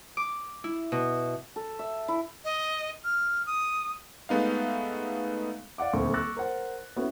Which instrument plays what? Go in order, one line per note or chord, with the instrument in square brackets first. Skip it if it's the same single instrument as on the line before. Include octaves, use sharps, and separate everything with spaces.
[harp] D6
E4
B2
[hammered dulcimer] A4
E5
E4
[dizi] D#5
F6
D#6
[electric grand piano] G#3 A3 B3 D#4 F5
[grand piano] D5 F5 F#5 D6
D#1 D2 C4 C#6
C#6 D6 E6 F#6 A6 A#6
A#4 C5 F#5
B3 C#4 E4 F#4 A4 B4